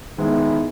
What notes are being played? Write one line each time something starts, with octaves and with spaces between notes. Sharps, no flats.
D#3 G#3 B3 E4